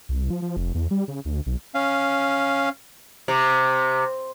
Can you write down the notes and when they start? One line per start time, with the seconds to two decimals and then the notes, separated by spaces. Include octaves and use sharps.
0.09 C2
0.30 F3
0.42 F3
0.57 F1
0.75 E2
0.91 G3
1.08 C#3
1.25 D2
1.46 B1
1.75 C#4 F5
3.28 C3